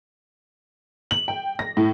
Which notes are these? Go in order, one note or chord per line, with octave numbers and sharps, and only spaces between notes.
F#7
G5
A#6
A2